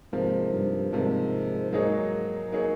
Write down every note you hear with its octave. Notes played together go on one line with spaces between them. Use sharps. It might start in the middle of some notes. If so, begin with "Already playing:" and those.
G#2 C3 F3 A#3
G2
G#2 C3 F3 A#3
G#2 F#3 A#3 D#4 G#4 C#5
F#3 A#3 D#4 G#4 C#5